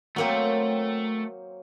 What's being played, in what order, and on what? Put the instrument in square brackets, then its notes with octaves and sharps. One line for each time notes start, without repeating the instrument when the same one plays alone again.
[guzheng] F#3 A#3 C4 [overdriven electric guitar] A3